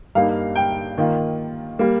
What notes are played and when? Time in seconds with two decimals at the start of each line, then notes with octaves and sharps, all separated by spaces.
0.15 G2 G3 A#3 D#4 F5
0.55 G5
0.98 D#3 A#3 F4
1.79 G3 A#3